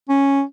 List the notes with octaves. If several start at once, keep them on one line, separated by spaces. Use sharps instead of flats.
C#4